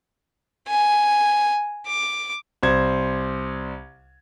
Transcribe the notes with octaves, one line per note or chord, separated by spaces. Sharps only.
G#5
D6
C2 C5 G#6